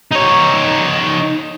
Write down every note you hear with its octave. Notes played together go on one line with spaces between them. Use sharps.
D#4 C#5